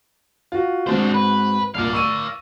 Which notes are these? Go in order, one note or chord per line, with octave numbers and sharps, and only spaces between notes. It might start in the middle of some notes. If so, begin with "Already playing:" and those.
F4 F#4
G#2 C4 D4 F#4 C5
B4
C2 G2 A#2 D5 F5
C#6 E6 D#7